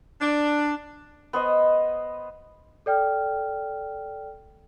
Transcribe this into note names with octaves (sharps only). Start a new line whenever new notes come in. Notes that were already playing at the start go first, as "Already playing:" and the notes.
D4
B3 C5 D#5
A4 D5 G5 F6